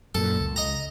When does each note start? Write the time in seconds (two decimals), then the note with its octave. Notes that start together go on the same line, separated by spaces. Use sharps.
0.15 F#2 A#2 A4
0.40 C#2
0.56 D#5 A#5